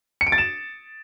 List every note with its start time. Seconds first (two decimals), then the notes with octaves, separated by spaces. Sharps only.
0.21 C#7
0.27 D7
0.32 A6
0.38 E7